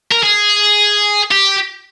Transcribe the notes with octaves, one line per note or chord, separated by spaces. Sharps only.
A#4
G#4
G4